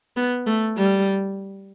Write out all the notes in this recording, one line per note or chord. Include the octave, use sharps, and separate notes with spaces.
B3
A3
G3